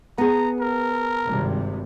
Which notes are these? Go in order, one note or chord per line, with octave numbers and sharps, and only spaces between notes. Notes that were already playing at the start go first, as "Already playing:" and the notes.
B3 G#4 A#5
A#4
G#1 G2 C3